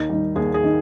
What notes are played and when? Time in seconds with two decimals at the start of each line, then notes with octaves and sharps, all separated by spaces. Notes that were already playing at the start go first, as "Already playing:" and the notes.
Already playing: D#2 D#4
0.09 D#3 G3
0.36 D#2 G#4
0.54 G#4
0.64 D#3